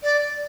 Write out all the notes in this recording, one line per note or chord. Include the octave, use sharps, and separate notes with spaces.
D5